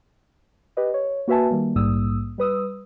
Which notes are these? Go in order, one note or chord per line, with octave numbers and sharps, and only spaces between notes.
G4 B4 D#5
C#5
A#3 F#4 B4 E5 G#5 A5
D#3 G3 A#3
A#1 G#2 G3 A#3 D#6 E6
G3 B4 D#6 E6